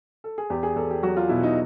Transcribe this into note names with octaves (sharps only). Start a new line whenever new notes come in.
A4
G#4
E2 G4
G#4
E2 A4
G4
F#3 F#4
F4
B2 E4
D#4